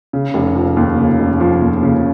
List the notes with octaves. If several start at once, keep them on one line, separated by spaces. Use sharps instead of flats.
C#3
F1
F3
D#2
C#3
F1
F3
D#2
C#3